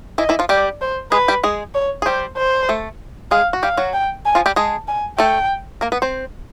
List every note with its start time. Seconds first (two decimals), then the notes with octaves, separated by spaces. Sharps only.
0.18 E3 E4 D#5
0.29 E3 E4
0.39 F3 F4
0.49 G3 G4 D5
0.81 C5
1.12 G#3 G#4 B4
1.28 G3 G4
1.44 G#3 G#4
1.75 C#5
2.02 G#4
2.06 G3 G4 C5
2.37 C5
2.69 A3 A4
3.31 G#3 G#4 F5
3.53 F#4
3.63 G3 G4 F5
3.77 F#3 F#4
3.94 G5
4.26 G#5
4.35 F3 F4
4.46 G3 G4
4.56 G#3 G#4 A5
4.88 G#5
5.18 A3 A4 G5
5.81 A#3 A#4
5.92 B3 B4
6.02 C4 C5